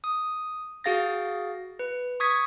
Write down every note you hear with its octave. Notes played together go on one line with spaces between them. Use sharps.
D#6
F#4 G#4 F5 A6 A#6
B4
C#6 D#6 G#6 B6